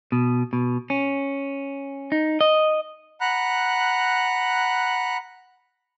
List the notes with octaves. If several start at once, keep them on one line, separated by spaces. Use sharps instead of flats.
B2
B2
C#4
D#4
D#5
F#5 A#5 B5 F#6